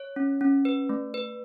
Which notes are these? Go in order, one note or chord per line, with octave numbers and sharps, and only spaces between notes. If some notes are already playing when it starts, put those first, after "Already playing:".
Already playing: C#5
C#4
C#4
B4
A3
B4